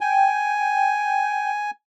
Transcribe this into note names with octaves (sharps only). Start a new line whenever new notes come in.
G5 G#5